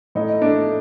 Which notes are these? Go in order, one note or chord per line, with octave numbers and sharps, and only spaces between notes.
A2 D#4
A3 D4